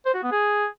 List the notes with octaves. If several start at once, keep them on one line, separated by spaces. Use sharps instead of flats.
C5
F#4
B3
G#4